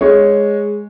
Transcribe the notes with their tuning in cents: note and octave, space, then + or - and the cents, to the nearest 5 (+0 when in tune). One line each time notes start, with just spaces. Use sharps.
G#3 +0 C#5 +0